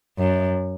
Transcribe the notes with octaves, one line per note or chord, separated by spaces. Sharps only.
F#2